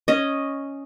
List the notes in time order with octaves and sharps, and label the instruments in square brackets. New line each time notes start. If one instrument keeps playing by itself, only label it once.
[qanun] C#4 D#5